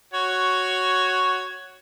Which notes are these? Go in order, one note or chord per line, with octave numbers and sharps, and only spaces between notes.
F#4 C#5